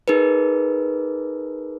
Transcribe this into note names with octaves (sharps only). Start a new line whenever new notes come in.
D#4 G#4 A#4 B4